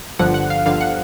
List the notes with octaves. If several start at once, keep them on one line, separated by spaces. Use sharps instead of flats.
G1 G2 D3 F3 F#5
F#5
F5
G1 G2 D3 F3 F5
F#5